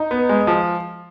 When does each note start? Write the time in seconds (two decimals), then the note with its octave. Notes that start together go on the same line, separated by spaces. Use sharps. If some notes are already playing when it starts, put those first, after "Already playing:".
Already playing: D#4
0.11 B3
0.29 G#3
0.47 F3